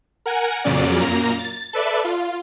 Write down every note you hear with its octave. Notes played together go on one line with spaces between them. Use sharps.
A#4 F#5 G#5
F2 A#2 C#3 F#3 C#4 D5
F#2 A#2 A#3 A#5
A6
A4 B4 D5 E5
F4